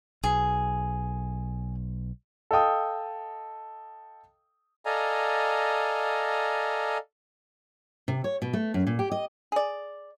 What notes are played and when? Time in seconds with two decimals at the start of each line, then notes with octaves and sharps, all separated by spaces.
0.24 B1 G#4
2.51 A4 D#5 F5 G5 D#6
4.85 A4 D5 D#5 F5 G#5 A#5
8.08 C3
8.24 C#5
8.42 B2
8.53 A3
8.74 F#2
8.87 A#2
8.99 G4
9.11 D#5
9.52 G#4 D5